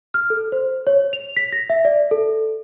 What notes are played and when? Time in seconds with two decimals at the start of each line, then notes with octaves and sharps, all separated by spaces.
0.14 F6
0.30 A4
0.52 C5
0.87 C#5
1.13 F7
1.37 B6
1.52 A#6
1.70 E5
1.85 D5
2.11 A4